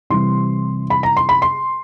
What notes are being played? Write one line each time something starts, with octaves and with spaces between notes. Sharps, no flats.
C3 E3 G3 C6
B5
A#5
C6
B5
C6